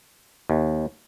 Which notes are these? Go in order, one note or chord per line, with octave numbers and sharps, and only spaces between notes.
D#2